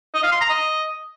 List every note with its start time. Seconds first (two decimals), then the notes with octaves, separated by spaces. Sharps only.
0.14 D#5
0.23 F5
0.32 C6
0.41 A#5
0.50 D#5